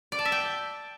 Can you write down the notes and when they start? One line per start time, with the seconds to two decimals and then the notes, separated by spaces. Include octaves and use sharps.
0.12 D5
0.19 A5
0.25 E5
0.32 G5